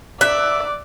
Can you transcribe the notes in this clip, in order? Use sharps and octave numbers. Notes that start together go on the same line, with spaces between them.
D5 E5 D6 F#6